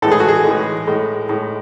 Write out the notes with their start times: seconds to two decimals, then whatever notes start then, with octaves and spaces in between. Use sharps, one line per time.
0.02 A2 E3 G#3 A4
0.11 G#4
0.20 F#4
0.28 G#4
0.44 A2 E3 G#3
0.87 A2 G#3
1.29 A2 G#3